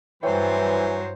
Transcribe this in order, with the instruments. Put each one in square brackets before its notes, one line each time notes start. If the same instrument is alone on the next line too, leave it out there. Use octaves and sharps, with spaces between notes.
[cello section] G2 C5 [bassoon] E3 [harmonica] F#3 G#5 [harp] C#5 G5
[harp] E4